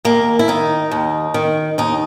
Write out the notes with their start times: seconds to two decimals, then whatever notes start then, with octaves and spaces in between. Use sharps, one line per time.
0.05 D#2 A#3
0.39 E4
0.48 D#3 D#4
0.91 D#2
1.34 D#3
1.78 D#2 D#4